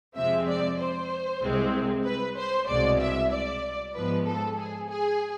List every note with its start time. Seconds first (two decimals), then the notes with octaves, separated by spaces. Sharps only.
0.16 F2 C3 F3 G#3 C4 E5
0.48 D5
0.79 C5
1.42 C2 C3 G#3 C4
2.06 B4
2.38 C5
2.68 C2 B2 G#3 D5
3.01 E5
3.32 D5
3.94 G#2 F3 G#3 B3 B4
4.27 A4
4.58 G#4
4.89 G#4